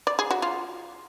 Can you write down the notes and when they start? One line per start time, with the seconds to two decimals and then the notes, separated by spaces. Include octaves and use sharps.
0.07 D5
0.19 G#4
0.31 F#4
0.42 F4